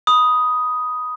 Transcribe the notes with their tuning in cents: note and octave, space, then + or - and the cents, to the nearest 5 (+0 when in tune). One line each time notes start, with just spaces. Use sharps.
B5 +0 D#6 +5